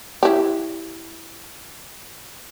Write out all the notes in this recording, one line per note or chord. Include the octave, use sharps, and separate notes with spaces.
E4 G4